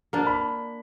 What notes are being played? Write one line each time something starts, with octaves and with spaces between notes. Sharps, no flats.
A#3 D4
B5